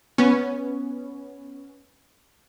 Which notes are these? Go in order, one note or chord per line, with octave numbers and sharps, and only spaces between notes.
B3 C#4